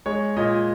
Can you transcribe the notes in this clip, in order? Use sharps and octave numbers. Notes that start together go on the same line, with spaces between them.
G#3 C#5
A#2 D#5